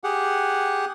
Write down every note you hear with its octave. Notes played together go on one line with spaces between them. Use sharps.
G4 G#4 F#5